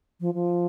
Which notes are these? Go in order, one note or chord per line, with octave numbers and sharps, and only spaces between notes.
F3
F3